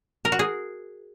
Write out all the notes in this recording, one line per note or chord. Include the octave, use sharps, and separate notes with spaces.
A#4
F#4
G#4